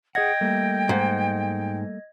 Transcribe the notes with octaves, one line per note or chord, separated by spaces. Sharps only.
G#4 D#5 F#5 G5 G#6 A#6
G3 A3 A#3
G#2